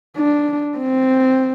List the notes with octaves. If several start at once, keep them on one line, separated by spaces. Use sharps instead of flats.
D4
C4